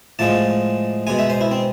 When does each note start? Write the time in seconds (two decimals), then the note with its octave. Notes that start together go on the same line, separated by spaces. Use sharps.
0.19 A2 F3 G#3 A5
1.07 B2 G#3 G#5
1.19 E5
1.30 C5
1.41 E4
1.51 C4